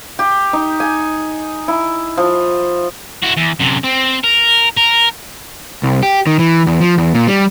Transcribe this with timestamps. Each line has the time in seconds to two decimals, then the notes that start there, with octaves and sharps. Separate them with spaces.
0.19 G4
0.53 D#4
0.80 G#5
1.68 E4
2.17 F3
3.23 E4 F#4
3.37 E2
3.59 F#2 C3
3.84 C4
4.24 A#4
4.77 A#4
5.83 C2
6.03 G4
6.27 D#3
6.39 E3
6.67 E2
6.81 F3
6.98 E2
7.14 A#2
7.28 G3